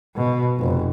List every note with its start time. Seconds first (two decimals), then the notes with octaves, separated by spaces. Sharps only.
0.16 B2
0.58 F1